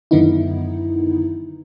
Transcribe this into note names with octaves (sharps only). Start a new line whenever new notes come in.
F#2 D3 D#3 B3 D#4 E4